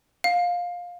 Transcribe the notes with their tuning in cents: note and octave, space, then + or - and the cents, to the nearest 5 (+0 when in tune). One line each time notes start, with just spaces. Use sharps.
F5 +15